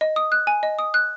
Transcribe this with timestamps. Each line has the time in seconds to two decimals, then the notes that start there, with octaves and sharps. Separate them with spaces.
0.01 D#5
0.16 D#6
0.32 F#6
0.47 G#5
0.63 D#5
0.79 D#6
0.94 F#6